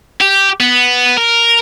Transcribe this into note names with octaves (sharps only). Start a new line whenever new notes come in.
G4
B3
A#4